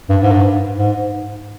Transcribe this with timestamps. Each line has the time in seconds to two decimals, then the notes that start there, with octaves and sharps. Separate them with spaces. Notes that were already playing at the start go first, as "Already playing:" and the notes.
0.09 G2
0.22 G#2
0.31 G2
0.77 G#2